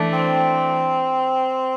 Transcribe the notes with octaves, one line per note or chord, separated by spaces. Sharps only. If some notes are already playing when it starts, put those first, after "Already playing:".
Already playing: E3 A3 D4
C4